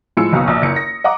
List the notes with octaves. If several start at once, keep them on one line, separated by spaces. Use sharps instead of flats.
A2 F3 G#3 E6 C#7
F#1 B1 B2 F5 C#6 D#6
A#1
F#1 C#7
A#6
D#5 F#5 A#5 D6